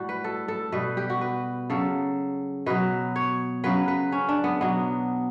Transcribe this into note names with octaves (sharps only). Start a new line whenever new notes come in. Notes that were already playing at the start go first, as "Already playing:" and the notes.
Already playing: A2 G3 F#4
B4
A4
A4
B2 G3 B4
G4
F#4
B4
C#3 F#3 A4
B2 F#3 B4
C#5
C#3 F#3 B4
B4
C#4
D4
B3
B2 F#3 B3